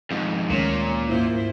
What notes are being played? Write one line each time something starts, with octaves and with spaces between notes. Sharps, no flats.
F2 G#2
D2 A#2 D#3 G#3 C#4
G#2 A#3 E4 F4 C5